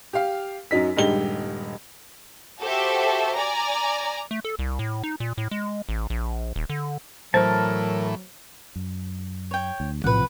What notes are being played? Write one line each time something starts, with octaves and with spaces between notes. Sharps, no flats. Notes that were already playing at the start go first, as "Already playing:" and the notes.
G4 F5
F#2 F#3 D#4 B6
D#1 G2 G#3 D#4 G4 G7
F#4 G4 A4 C5 E5
D5 G#5 A#5
A3
A4
C2
A2
D#4
A#2
A2
G#3
A1
A#1
D#1
D3
A2 E3 F#3 A#4 C5 A5
F#2
C#5 G5
D2
B1 A2 C3 F3 B4 F#5